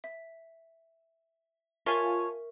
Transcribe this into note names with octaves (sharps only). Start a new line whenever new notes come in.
E5
F4 A#4 C#5 E5 G#5 A5 C#6